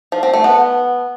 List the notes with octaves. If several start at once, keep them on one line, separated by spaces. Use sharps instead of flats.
F3
C4
A3
B3